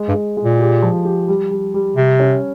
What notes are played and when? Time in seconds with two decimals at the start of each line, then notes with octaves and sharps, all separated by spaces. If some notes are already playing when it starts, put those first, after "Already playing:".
Already playing: G#3
0.08 G2
0.14 G#3
0.37 G#3
0.43 A#2
0.60 G4
0.82 F3
1.05 G4
1.28 G3
1.51 G3
1.74 G3
1.96 C3 G3
2.19 C#4